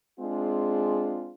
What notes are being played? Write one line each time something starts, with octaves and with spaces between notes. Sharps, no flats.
G#3 C4 D4 F4 G#4